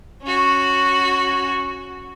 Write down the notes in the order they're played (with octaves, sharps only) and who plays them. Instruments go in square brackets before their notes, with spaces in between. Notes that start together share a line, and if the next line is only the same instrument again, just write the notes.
[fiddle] C#4 F#4